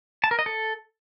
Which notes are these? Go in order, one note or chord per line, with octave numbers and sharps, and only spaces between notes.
A5
A#4
D#5
A4